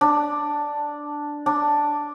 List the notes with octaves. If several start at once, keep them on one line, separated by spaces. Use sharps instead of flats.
D4
D4